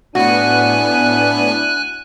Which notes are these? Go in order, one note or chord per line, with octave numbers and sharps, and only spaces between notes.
A2 B3 D4 E4 F#4 G#5 F#6